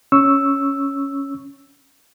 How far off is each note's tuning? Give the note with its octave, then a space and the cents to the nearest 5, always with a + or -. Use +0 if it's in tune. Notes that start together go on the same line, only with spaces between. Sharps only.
C#4 +0 C#6 +0 E6 +0